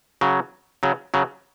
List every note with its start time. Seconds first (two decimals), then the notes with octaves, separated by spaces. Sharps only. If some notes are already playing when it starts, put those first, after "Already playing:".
0.21 C#3 F#3
0.83 C#3 F#3
1.14 C#3 F#3